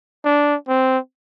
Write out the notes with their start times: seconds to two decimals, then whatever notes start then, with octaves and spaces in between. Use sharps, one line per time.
0.24 D4
0.68 C4